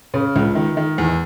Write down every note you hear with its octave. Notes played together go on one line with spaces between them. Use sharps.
C#3
C#2
D#3
D#3
E2